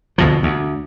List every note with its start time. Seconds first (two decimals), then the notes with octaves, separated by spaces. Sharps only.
0.18 D2 B2 F3
0.43 D2